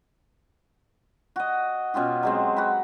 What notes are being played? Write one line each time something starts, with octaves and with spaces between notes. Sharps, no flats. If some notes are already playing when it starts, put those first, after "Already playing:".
F#4 D#5
B2 C#4 F4 G4
F#3 G#3 C4
F#4 B5